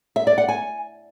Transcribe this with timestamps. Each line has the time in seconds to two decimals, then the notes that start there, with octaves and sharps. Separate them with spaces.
0.16 E5
0.27 D5
0.38 F#5
0.49 G#5